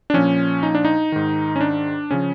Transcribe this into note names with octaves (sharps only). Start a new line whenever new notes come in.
D4
A#2 F3 C#4
D#4
D4
D#4
G#2 D#3
C#4
D4
C#3 F3 C#4